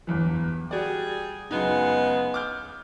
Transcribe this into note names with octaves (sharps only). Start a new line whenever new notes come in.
G1 E2 E3
G3 F#4 G#4 D5
F#2 C#3 G#3 B3 D#4
D6 F6 G6